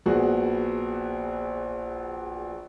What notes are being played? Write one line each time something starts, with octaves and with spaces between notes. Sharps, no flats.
A#1 B3 F#4 G#4 B4